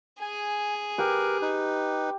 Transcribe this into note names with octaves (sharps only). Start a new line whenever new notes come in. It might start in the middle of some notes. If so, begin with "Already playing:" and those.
G#4 G#5
G4 A#4 B4
D#4 B4